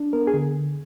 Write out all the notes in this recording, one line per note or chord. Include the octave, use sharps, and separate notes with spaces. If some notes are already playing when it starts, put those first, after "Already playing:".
Already playing: D4
B3 A#4
G#4
D3